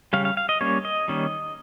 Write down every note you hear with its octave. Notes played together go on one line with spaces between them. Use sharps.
C#3 G3 C#4 F5
F5
F5
D#5
G3 A#3 C#4 C#5
D#5
D#3 G3 A#3 C#4